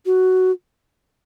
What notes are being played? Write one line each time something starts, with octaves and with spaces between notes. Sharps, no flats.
F#4